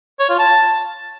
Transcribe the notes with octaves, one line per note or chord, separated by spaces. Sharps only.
C#5
F4
A5